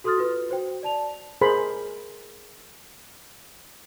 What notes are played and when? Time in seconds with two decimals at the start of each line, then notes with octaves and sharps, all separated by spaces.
0.04 F#4 A4 C6 D#6 F6 A6
0.18 F4 B4
0.49 F#4 C5 G5
0.83 D5 A5 F7
1.41 G#4 A#4 C5 B5 C6